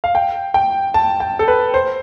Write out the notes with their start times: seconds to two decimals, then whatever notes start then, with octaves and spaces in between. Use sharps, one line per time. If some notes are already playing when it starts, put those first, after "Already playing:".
0.04 F5
0.15 G5
0.54 G5
0.94 A5
1.20 G5
1.39 A4
1.48 B4
1.74 C5